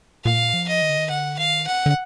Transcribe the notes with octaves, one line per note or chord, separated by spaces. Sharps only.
A#2 F5
F3
D#5
D#3
D3
D#3
D3 F#5
D#3 F5
F#5
D3